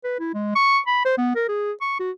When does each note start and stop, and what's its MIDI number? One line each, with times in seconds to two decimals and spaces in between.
0.04 0.19 71
0.19 0.31 64
0.34 0.52 56
0.56 0.79 85
0.87 1.03 83
1.05 1.17 72
1.18 1.32 59
1.35 1.48 70
1.49 1.72 68
1.81 1.99 85
2.00 2.11 66